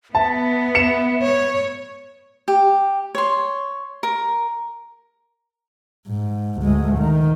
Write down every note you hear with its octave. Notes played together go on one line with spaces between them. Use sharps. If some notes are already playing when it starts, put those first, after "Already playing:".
B3 E5 A5
C#7 E7
C#5
G4
C#5 C6
A#4
G#2
D2 G#3
D#3